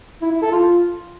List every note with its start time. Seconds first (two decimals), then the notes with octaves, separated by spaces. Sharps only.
0.21 E4
0.32 E4
0.42 A4
0.52 F4